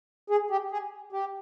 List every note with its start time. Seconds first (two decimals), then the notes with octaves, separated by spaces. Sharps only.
0.30 G#4
0.51 G4
0.72 G#4
1.12 G4